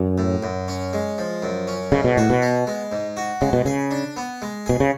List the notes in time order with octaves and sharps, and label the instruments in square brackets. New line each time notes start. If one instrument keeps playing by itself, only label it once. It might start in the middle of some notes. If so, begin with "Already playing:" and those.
Already playing: [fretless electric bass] F#2
[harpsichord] A2
F#2
C#4
G#3
F3
F#2
C#4
[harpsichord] G#2 [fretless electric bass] C#3
[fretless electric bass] B2
[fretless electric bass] A2 [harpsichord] F#4
[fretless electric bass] B2
[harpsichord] B3
G#3
G#2
F#4
[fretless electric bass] C#3 [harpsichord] G#3
[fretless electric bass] B2
[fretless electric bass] C#3 [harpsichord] G#4
[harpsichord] D4
B3
G#3
[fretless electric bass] B2 [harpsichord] G#4
[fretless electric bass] C#3